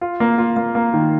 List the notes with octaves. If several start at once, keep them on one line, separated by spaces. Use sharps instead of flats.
F4
A#3
F4
A#3
A#3
D#3